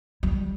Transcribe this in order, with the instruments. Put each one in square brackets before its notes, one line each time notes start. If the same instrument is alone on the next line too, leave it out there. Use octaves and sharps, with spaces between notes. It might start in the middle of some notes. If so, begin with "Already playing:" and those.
[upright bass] G3